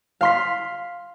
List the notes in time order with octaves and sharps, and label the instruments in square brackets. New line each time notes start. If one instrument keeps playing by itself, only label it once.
[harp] F5 C6 B6